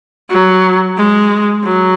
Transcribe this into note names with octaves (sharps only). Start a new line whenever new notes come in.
F#3
G#3
F#3